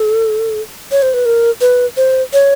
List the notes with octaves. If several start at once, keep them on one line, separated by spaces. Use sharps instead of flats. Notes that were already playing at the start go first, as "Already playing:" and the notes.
Already playing: A4
C#5
C5
B4
A#4
B4
C5
C#5